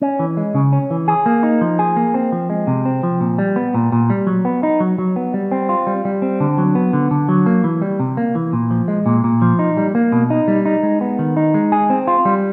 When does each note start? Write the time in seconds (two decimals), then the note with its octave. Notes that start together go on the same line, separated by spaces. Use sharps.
0.02 C#4
0.19 E3
0.37 G#3
0.55 C#3
0.73 C#4
0.91 E3
1.08 G#4
1.26 A#3
1.43 D#4
1.61 F3
1.79 G#4
1.97 A#3
2.14 C4
2.32 F3
2.50 G#3
2.67 C3
2.85 C4
3.03 F3
3.21 A#2
3.38 G3
3.56 B3
3.74 A#2
3.92 A#2
4.10 G3
4.27 F#3
4.45 B3
4.63 D#4
4.80 F#3
4.98 F#3
5.16 B3
5.34 G3
5.51 C4
5.69 F4
5.87 G3
6.05 G3
6.22 C4
6.40 D3
6.58 F#3
6.75 B3
6.93 D3
7.11 D3
7.29 F#3
7.46 A#3
7.64 E3
7.82 G3
8.00 C3
8.17 A#3
8.35 E3
8.53 A#2
8.71 F3
8.88 G#3
9.06 A#2
9.24 A#2
9.42 F3
9.59 D#4
9.77 G3
9.95 A#3
10.12 B2
10.30 D#4
10.48 G3
10.66 D#4
10.83 G#3
11.01 B3
11.19 D#3
11.37 D#4
11.54 G#3
11.72 G#4
11.90 C4
12.07 F4
12.25 G3